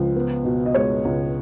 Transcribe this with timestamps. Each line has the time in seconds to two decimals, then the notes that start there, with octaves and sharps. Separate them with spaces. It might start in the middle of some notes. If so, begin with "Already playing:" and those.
Already playing: C#2 F3
0.16 B3
0.45 B2
0.66 D#5
0.74 G#3 C#5
1.05 C#2